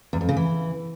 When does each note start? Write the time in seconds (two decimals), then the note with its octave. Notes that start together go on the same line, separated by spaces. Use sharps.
0.13 E2
0.21 F2
0.29 C#3
0.37 E3